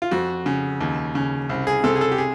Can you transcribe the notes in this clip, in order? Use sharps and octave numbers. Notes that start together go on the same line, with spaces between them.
F4
F2 F#4
C#3
D#2
C#3
C2
G#4
C3 A4
G#4
A4
G4
G#4